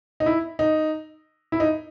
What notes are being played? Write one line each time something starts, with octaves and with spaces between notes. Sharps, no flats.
D#4
E4
D#4
E4
D#4